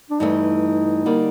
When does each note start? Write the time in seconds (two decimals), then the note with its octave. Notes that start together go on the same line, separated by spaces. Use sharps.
0.10 D4
0.19 G2 E3 A3 D#4
1.06 D3 G3 A#3